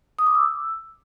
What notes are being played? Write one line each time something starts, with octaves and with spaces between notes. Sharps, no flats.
D#6
D6
E6